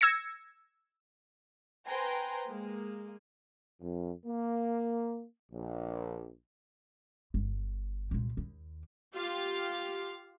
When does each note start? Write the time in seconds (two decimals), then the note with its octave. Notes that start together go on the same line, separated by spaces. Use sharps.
0.01 E6 G#6 A#6 C#7
1.87 B4 C5 G5 G#5 A#5 C6
2.47 G#3 A#3
3.81 F2
4.25 A#3
5.52 A#1
7.34 G1
8.11 C2 A#2
8.37 D#2
9.15 F4 G4 F5